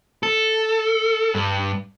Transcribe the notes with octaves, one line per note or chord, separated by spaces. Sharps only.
A4
G2